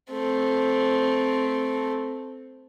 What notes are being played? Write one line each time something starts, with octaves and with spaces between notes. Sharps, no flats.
A3 C4